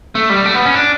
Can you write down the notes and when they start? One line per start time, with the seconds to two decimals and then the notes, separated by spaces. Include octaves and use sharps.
0.15 A3
0.30 G3
0.46 A3
0.54 B3
0.65 C#4
0.75 D4